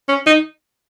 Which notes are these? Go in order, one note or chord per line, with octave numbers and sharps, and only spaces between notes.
C#4
D#4